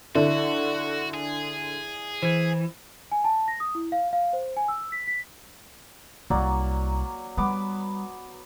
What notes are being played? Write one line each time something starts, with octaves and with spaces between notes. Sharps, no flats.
D3 E4 F#4 D5 E5
G#4
E3 C5 G#6
G#5
A5
A#6
D#6
E4
F5
F5
C5
G#5
E6
B6
B6
C2 F#3 A#3 D5
G3 B3 D6